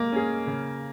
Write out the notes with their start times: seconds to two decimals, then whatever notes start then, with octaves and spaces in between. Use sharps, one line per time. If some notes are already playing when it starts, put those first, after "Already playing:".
Already playing: G#3 A#3
0.12 C#4 G#4
0.47 C#3